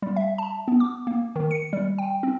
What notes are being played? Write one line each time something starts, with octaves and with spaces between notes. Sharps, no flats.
G3
E5
A5
B3
D6
A#3
D#3
C#7
G3
G5
C4